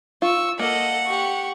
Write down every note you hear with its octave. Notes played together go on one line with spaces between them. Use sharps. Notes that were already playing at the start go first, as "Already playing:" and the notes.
F4 C#6 E6
A#3 A4 D#5 F#5
G4 C#6